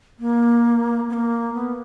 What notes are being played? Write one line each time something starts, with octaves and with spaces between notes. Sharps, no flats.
A#3
B3
A#3
B3